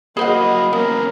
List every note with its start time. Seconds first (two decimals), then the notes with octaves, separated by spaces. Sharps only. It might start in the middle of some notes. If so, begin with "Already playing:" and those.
0.17 F#2 A#3 F#4 G#4 C5 D#5 F#5 B5
0.73 A#3 B3 C#4 A#4